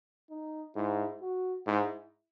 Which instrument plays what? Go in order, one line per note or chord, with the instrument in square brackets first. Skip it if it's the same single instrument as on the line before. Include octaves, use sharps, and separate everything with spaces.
[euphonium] D#4
[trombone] G#2 [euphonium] E4
[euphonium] F#4
[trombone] G#2 [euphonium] E4